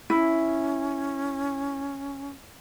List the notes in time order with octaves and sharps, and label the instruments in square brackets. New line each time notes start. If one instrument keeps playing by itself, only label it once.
[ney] C#4 [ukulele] E4